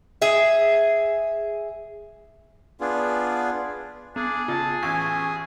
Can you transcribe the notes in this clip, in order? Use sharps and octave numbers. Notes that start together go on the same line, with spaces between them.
G#4 E5
B3 D4 F4 G#4
B3 D4 G#4
C#3 F4 A5
A1 G#5 C#6 E6